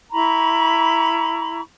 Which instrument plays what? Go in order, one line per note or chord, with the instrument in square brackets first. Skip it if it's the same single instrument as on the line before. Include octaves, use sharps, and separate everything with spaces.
[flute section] E4 A#5 B5 C#6